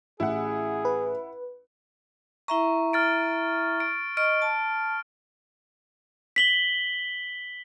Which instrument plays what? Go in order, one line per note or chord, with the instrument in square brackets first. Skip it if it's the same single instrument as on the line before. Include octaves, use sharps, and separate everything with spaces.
[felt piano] A1 [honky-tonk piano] E4 F#5 [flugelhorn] G#4
[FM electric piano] B4
[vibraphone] E4 E5 A#5 [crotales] C#6
[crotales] F6 A6 D7
D7
[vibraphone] D#5 C#6 [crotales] F6 D7
[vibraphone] A5
[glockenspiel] B6 F#7 G7